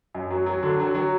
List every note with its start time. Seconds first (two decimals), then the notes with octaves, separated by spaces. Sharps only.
0.15 F#2
0.31 F#3
0.46 F#3
0.63 D3
0.80 F#3
0.95 F#3